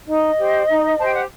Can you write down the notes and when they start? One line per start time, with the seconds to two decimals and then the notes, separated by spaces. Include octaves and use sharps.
0.07 D#4 D#5
0.37 G4 C5
0.69 D#4
0.99 C5 A5
1.05 G4 G5
1.14 F#5